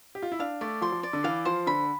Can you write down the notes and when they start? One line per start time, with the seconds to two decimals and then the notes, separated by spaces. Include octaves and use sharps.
0.15 G4
0.23 F4
0.32 E4
0.39 D4 F5
0.61 A3 D5
0.82 F3 C6
0.92 F3
1.03 D5
1.13 D3
1.24 E3 F5
1.45 F3 C5
1.67 D3 B5